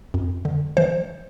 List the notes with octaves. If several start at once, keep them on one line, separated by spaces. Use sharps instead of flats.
F2
D3
E3 C5